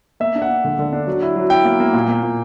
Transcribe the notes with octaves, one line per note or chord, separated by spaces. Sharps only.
A#3 E5
D4
F#5
D4
D3
D3
D4
F#3
E4
F#3
E4 G5
A#3
A#3
A#2
A#3
A#2